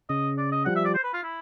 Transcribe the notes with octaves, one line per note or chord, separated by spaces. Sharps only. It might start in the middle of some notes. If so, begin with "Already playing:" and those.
C#3 D#5
D5
D#5
F3 G3 F#5
E5
D5
C5
B4
F4
E4